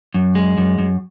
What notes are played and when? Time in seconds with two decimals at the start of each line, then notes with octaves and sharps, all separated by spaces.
0.14 F#2
0.35 G#3
0.58 F#2
0.79 F#2